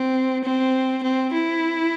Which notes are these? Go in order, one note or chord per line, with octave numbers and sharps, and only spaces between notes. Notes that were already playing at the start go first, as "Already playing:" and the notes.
Already playing: C4
C4
C4
E4